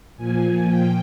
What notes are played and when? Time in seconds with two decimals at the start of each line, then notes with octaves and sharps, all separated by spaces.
0.17 A#2 F3 G#5
0.66 G5